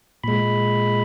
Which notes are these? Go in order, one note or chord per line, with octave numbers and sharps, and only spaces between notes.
A#2 G#3 B5